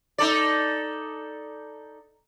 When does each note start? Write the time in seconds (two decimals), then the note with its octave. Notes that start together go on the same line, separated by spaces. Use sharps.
0.18 D#4 A4 D5